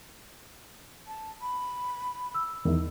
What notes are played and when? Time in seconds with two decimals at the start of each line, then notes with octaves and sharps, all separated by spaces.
1.07 A5
1.41 B5
2.35 E6
2.65 E2 D#3 E4